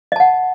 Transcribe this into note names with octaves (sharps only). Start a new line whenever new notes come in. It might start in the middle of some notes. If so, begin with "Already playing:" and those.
D#5 F#5 A5